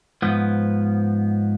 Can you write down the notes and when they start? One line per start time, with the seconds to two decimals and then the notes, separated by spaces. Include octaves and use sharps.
0.22 G#2 F3 B3